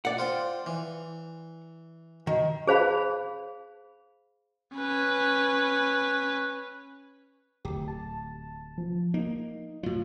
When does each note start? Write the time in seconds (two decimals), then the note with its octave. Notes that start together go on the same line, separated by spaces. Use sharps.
0.05 D5 F#5
0.18 F4 C5 G5
0.66 E3
2.27 D#3
2.67 G#4 C5 F5 B5
4.75 C#4 B4
7.65 D1 G4
7.88 A5
8.78 F3
9.14 A#3 D#4
9.83 A2 F#3 F4